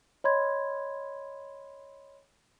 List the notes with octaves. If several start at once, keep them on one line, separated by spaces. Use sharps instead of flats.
C#5 D#5 B5 C6 G#6